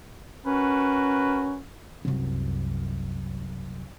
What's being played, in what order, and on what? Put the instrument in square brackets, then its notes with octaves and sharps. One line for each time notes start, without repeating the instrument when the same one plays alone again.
[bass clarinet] C#4 [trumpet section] F#4 A#4 B4
[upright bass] C2 F#2